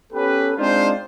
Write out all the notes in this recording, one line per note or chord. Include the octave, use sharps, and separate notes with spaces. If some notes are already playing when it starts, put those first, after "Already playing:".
B3 C#4 G4 A4 B4
G#3 C4 D4 D#4 F4 C5